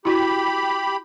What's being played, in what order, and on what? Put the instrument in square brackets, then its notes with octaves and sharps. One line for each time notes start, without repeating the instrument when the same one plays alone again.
[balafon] E4 F#4 [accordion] G4 B5